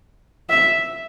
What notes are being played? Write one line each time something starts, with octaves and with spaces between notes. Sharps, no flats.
E5